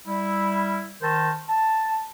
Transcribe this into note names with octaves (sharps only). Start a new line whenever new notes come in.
G3 E4
D#3 A#4 C5 A5
A5